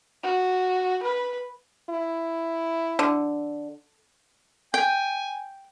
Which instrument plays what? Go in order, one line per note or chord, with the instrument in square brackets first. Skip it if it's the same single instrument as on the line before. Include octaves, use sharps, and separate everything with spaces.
[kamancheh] F#4
B4
[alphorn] E4
[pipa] D3
[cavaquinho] G5 [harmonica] G#5